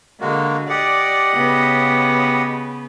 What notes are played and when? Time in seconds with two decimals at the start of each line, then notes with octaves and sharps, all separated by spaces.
0.21 D3 G#3 A#3 F#4
0.70 G4 D5 D#5 F#5
1.35 C#3 B3